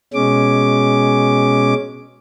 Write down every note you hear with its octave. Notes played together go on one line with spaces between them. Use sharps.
B2 G#3 C#4 D6